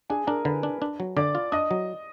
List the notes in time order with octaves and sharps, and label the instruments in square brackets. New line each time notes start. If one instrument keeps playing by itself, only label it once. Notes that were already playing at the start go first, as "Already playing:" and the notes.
[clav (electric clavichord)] D4 [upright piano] G#4 G#5
[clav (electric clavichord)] D4 [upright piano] A#4 A#5
[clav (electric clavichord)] D3 [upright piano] B4 B5
[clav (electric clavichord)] D4
D4
F#3
[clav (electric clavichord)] D3 [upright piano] D5 D6
[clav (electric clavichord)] F4
[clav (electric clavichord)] D4 [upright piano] D#5 D#6
[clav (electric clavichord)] F#3